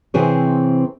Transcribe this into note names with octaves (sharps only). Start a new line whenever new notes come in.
C3 E3 C4 G#4 B4 C#5